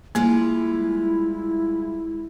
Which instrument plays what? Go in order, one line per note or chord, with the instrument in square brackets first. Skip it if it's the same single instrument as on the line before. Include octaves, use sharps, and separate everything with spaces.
[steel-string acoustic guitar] G3 G#3 F4 [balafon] A#3 [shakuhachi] E4